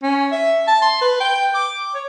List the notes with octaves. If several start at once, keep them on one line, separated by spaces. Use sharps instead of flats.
C#4
E5
A5
C6
B4
G5
D6
C#5